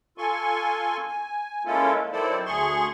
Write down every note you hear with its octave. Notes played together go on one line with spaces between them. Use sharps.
F4 A4 G#5 C6 C#6
G#5
G#3 A#3 C#4 E4 F4 A4
D#3 F#3 E4 A4 C5 D5
D2 G#4 C6 C#6